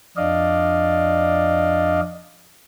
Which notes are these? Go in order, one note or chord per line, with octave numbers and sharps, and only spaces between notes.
F2 D4 D5 D#5 F5